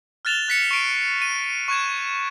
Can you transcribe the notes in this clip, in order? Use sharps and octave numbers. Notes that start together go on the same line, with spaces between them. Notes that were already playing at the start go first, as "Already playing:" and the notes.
F6 F#6 A6 E7 F7 G7
F#6 B6 C#7
C#6 C7 D7 D#7
D#7
C#6 F#6 G#6 E7